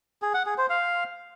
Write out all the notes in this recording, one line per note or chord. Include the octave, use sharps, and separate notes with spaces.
G#4
F#5
G#4
C5
F5